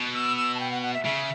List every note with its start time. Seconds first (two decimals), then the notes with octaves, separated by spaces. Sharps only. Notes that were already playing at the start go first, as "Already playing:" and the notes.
Already playing: B2
0.14 E6
0.37 E6
0.55 A5
0.60 G5
0.71 F#5
0.82 F#5
0.94 E5
1.05 C#3 E5